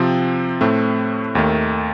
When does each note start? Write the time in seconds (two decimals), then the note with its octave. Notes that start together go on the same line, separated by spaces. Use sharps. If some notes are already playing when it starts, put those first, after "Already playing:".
Already playing: C3 F3 C4
0.61 A2 A3 C4
1.35 D#2 D#3 A3